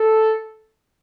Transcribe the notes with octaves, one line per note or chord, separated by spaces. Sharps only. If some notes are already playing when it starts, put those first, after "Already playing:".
Already playing: A4